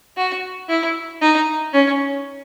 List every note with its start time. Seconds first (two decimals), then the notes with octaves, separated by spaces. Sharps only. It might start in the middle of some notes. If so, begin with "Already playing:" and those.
0.17 F#4
0.69 E4
1.21 D#4
1.73 C#4